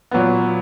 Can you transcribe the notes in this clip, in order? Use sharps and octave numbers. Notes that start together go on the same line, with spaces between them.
A#2 F#3 B3